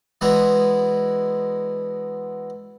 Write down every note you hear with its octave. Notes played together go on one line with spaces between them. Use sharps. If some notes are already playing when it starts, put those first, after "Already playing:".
E3 G#3 B3 D4 F#4